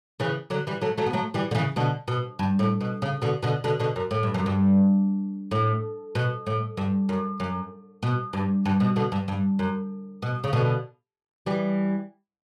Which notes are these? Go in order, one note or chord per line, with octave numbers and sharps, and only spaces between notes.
C#3 E3
D3 F#3
E3 G3
F#3 A3
F#3 A3
B3
F#3 A3
E3 G3
D3
C#3 E3
B2 D3
B2
G2
A2
B2
C#3
B2 D3
B2 D3
B2 D3
B2 D3
F#2
A2
G2
F#2
G2
A2
B2
A2
G2
F#2
F#2
B2
G2
G2
B2
B2 D3
G2
G2
F#2
B2
C#3
B2 D3
E3 G3